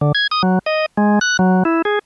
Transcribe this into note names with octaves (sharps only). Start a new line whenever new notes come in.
D3
G#6
D#6
F#3
D#5
G#3
F#6
F#3
E4
G#4